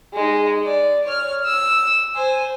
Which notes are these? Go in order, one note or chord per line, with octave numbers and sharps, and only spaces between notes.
G#3 D#4
D5
C#5 F6
E6
C5 G#5